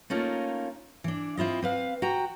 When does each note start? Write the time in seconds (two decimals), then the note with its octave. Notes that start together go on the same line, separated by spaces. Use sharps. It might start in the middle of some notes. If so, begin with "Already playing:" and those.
0.10 A3 A#3 C#4 D#4 F4
1.04 E3 D4
1.37 C4 E4 F4 D#5
1.62 C4 B4 F5
2.02 F#4 G5 A#5